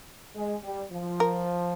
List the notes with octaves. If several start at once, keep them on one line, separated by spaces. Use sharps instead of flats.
G#3
G3
F3
A#4